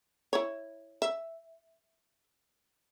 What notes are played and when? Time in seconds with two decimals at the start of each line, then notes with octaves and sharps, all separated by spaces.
0.33 E4 C#5
1.02 E5